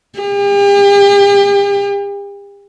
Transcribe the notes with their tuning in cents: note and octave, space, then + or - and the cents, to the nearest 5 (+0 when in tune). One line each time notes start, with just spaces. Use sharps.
G4 +40